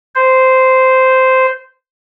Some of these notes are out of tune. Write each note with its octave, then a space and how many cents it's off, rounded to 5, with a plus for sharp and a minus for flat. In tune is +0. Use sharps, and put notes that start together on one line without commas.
C5 -10